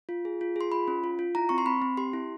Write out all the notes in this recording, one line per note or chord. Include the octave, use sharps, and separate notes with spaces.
F4
G#4
F4
G#4 C6
F4 B5
C#4
F4
F4
E4 A#5
C4 C#6
C6
C4 B5
C4
G4 C6
E4